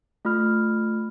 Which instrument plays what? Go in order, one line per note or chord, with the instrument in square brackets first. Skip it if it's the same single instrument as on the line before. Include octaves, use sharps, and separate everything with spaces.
[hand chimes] A3 F4 B5 F6